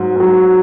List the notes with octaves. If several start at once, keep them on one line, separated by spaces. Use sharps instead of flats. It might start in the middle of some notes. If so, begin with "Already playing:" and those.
Already playing: G#2 F#3
G#2 F#3